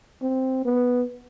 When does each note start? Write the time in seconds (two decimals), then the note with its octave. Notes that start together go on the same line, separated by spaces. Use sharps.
0.22 C4
0.65 B3